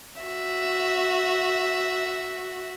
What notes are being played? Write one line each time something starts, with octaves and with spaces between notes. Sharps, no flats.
F#4 E5